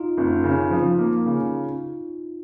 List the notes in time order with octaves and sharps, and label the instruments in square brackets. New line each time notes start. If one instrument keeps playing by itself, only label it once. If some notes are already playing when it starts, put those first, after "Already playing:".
Already playing: [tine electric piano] D#4 F4
[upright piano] F#1
C#3
F3
A#3
C#3